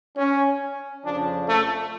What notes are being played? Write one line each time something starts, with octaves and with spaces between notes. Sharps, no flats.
C#4
F2 C#3 F3 D4
A3